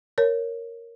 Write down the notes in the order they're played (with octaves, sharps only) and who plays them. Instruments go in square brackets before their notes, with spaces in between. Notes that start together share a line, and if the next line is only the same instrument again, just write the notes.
[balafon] A#4 C#5